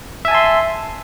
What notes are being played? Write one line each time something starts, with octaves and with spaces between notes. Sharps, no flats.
E5 G#5 A5 C6